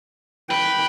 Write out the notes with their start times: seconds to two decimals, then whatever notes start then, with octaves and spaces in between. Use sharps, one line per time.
0.51 B4 G5